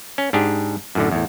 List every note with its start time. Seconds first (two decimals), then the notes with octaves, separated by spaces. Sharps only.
0.18 C#4
0.33 G#2 D4 G4 G#4
0.95 F#2 A2 D3
1.11 E2 A2